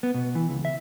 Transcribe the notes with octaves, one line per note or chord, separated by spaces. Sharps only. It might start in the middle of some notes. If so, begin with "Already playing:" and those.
B3
B2
E3
C#2
E5